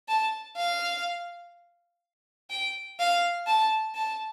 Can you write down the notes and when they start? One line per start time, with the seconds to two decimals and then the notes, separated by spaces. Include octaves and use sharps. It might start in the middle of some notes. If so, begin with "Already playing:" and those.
0.09 A5
0.57 F5
2.50 G5
2.99 F5
3.47 A5
3.95 A5